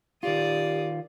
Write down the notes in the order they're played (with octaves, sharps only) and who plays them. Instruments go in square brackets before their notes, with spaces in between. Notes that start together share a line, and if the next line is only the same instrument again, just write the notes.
[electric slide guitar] D#3 F4 [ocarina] G4 [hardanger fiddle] D5 D#6